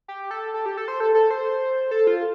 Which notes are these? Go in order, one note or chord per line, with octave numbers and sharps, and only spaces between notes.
G4
A4
A4
G4
A4
C5
A4
A4
C5
A4
F4